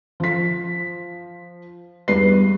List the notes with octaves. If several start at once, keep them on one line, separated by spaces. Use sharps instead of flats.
F3 B6
E2 G2 B4 C7